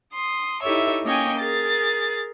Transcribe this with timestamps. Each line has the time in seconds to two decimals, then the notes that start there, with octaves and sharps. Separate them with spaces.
0.14 C6 D#6
0.62 D#4 E4 G4 A4 C#5 E5
1.04 A#3 C#4 C#5 D#5 G5 G#5
1.39 G#4 A#4 A6